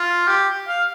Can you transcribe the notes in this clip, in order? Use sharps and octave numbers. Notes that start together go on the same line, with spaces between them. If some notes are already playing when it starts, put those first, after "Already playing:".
Already playing: F4
G4
F5